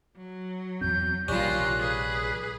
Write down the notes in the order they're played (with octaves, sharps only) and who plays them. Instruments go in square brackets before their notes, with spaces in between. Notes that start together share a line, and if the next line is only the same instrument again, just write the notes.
[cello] F#3
[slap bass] E2 C4 [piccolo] G6
[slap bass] A#1 C3 [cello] D#3 F4 [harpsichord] G3 C#4 [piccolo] F#6
[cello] G#4 B4